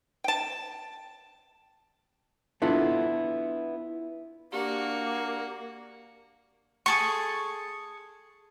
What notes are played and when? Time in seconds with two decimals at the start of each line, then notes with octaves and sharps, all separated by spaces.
0.24 G5 A5
2.62 B3 D4 E4 F4 A4 B4
4.52 A#3 D4 F#4 G4 F5
6.86 G#4 A4 C#6